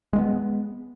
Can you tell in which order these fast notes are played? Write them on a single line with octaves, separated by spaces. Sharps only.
G#3 A#3 B3